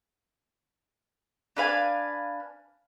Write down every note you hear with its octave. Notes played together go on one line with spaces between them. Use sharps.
D4 B4 F5 G#5